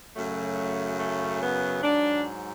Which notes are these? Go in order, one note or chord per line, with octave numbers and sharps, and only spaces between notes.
F#2 C#3 F#3 A3
A3
B3
G#2 F#3 D4